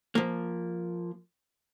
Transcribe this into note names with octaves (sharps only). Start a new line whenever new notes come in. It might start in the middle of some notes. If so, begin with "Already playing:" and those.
F3 A#3